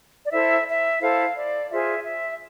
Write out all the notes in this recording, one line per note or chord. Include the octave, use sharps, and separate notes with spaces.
D5
E4 A4 C5 E5
E5
E4 A4 C5 F5
D5
F4 G#4 C5 E5
E5